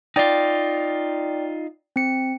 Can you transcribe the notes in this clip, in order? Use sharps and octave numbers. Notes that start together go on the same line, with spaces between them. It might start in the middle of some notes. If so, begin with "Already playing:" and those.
D#4 F4 D5 G5
C4 C#7